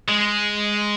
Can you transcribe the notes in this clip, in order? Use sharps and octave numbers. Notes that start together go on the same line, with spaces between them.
G#3